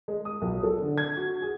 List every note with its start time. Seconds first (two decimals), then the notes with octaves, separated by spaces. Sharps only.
0.08 G#3
0.25 D#6
0.42 B1
0.63 A4
0.82 D3
0.98 G#6
1.17 F#4
1.42 G#4